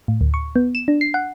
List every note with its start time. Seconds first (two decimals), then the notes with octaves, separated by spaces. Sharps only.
0.08 A2
0.21 D2
0.34 C#6
0.56 B3
0.75 E7
0.88 D4
1.01 C7
1.14 F#5